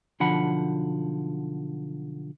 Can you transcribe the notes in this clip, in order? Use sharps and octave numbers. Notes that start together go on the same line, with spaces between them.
B1 D3 F3 F#5 B5